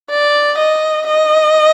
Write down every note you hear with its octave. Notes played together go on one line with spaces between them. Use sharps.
D5
D#5
D#5